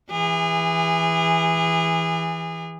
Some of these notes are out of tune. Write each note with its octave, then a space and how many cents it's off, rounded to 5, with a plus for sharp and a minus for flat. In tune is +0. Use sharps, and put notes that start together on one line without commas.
E3 +0 G#4 -30